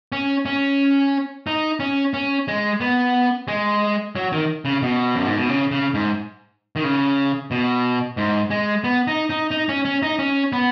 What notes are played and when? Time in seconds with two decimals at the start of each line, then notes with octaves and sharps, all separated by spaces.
0.12 C#4
0.46 C#4
1.47 D#4
1.80 C#4
2.14 C#4
2.48 G#3
2.81 B3
3.48 G#3
4.16 F#3
4.32 D#3
4.65 C#3
4.83 B2
5.15 F#2
5.26 G#2
5.37 B2
5.49 C#3
5.71 C#3
5.94 G#2
6.76 D#3
6.84 C#3
7.51 B2
8.17 G#2
8.50 G#3
8.84 B3
9.07 D#4
9.30 D#4
9.51 D#4
9.69 C#4
9.85 C#4
10.02 D#4
10.19 C#4
10.52 B3